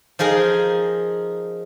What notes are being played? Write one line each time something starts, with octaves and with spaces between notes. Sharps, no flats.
F3 D#4 G#4 A#4